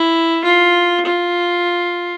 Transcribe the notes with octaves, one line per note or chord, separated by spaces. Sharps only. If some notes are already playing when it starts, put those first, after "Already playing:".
Already playing: E4
F4
F4